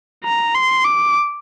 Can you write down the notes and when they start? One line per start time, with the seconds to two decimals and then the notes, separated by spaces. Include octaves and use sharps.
0.25 A#5
0.55 C6
0.84 D6